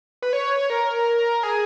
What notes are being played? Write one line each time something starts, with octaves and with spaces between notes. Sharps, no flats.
B4
C#5
A#4
G#4